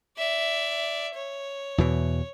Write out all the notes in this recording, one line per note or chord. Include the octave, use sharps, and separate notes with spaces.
D5 E5
C#5
E2 B2 E3